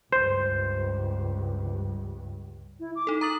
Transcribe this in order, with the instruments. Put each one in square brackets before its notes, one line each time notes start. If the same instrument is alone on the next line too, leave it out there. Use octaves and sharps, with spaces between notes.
[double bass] C#2 G2 [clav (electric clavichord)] C5
[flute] E4
D6
[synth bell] D#4 A4
[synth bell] A#5 A6 F#7 [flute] D#6